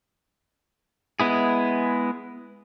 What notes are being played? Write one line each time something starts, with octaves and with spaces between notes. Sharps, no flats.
G#3 B3 E4 G#4